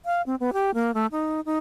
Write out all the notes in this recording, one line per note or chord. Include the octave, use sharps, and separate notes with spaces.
F5
C4
B3
G4
A#3
A3
D#4
D#4